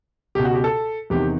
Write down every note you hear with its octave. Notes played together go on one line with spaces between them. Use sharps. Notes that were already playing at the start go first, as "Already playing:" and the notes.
C#2 B2 G4
F#4
G4
A4
E2 C3 D#3 G4